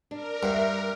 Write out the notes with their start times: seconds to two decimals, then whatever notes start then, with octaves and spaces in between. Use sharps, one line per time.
0.11 D4 A#4
0.43 G2 E5 F#5